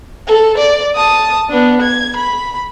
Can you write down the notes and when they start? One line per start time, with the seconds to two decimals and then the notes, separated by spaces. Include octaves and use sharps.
0.27 A4
0.58 D5
0.95 A5 D#6
1.50 B3 D4
1.82 G#6
2.17 B5